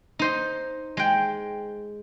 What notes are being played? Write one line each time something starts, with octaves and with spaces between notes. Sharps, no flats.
D#4 C5 D#5
G#3 G5